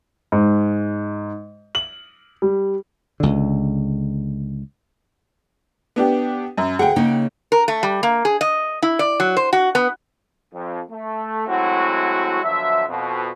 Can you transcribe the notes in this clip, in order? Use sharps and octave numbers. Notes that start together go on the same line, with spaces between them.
G#2
F#7
G3
C#2 D3
B3 D4 G4
F#2
D2 G#4 F#5 G5
C#3 A#3 D#4
A#4
A3
G3
A#3
G#4
D#5
E4
D5
F#3
C5
F#4
B3
F2
A3
F#3 G#3 A3 C4 E4 F#4
B2 D3 F3 F#3 E5
F2 B2